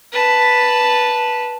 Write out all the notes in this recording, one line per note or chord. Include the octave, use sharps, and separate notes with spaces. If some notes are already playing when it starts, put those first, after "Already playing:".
B4 A5